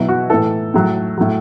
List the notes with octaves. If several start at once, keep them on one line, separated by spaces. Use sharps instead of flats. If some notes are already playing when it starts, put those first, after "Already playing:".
Already playing: B2 F#3 E4
F#4
A2 E3 A4
A2 F#3
A2 F#3